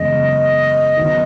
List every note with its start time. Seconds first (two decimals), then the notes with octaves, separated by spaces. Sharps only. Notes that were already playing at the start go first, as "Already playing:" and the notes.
Already playing: F#1 E2 C#3 G#3 D#5
0.97 D#3 F#3 B3